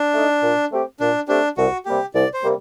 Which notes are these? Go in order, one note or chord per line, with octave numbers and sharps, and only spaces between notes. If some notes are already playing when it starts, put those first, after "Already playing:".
Already playing: D4
A3 D#4
A#2
A3 C4 G4
A#2 D4
A3 C4 D4 G4
C2 F#4
C3 G3 A#3 G4
C2 D5
C5
C3 G3 A#3